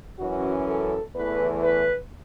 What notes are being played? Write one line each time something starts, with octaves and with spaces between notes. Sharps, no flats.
F#2 E3 C#4 F#4
A4
E2 E3 A3 B4
B4